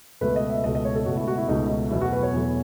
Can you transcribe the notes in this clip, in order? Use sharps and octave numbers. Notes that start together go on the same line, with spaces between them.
C#2 B2 A3 B4
D#5
E5
C#2 B2 A3 D#5
D#5
C#5
A4
C#2 B2 A3 F#4
E4
F#4
E4
C#2 B2 A3 D#4
E2 B2 F#3 A3 E4
F#4
B4
C#5
E2 B2 F#3 A3